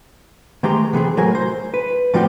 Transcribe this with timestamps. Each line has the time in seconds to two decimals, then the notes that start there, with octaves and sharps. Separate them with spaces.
0.63 D#3 G#3 A3 G4 A#5 C6
0.93 C3 E3 C4 G#4
1.17 A2 F#3 A#4 G#5
1.35 C5
1.74 B4
2.14 A2 F3 G3 C4 F#4 G4